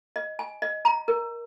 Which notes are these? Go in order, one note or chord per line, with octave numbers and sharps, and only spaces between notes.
D#5
G#5
D#5
A#5
A#4